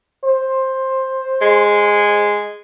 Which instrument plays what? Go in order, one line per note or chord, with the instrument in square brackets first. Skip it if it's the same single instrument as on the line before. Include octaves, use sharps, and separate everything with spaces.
[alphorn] C5
[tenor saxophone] G#3